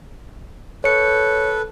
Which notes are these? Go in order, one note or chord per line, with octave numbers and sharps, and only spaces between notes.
A4 B4 C#5 C#7